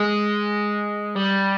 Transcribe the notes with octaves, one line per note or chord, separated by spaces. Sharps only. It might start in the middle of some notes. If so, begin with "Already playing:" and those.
Already playing: G#3
G3